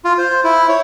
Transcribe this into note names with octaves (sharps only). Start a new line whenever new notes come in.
F4
C5
E4
C#5